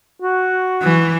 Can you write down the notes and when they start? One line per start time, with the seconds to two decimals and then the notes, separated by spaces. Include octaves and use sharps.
0.22 F#4
0.82 E3